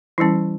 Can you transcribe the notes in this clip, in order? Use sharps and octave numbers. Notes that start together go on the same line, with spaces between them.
E3 G3 C#4 E4